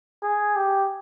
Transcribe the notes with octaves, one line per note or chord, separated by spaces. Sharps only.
G#4
G4